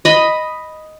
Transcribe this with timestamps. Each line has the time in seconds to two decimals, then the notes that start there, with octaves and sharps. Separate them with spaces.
0.05 D#5 B5